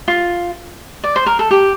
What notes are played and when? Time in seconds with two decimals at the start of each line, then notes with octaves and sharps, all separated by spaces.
0.08 F4
1.04 D5
1.16 C5
1.26 A#4
1.39 A4
1.51 G4